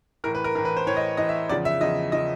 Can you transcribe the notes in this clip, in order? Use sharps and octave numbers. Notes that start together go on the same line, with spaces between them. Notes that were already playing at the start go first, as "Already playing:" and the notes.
A2 E3 A#4
B4
A#4
A2 E3 A#4
B4
C5
A2 E3 C#5
D#5
A2 E3 D#5
E5
E2 C#3 F3 D5
E5
E2 C#3 F3 D#5
C#3 F3 D#5